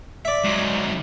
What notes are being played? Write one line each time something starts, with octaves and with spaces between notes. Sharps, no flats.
D5 E5
G#2 F#3